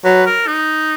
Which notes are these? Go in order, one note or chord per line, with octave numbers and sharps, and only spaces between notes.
F#3 B4
A#4
D#4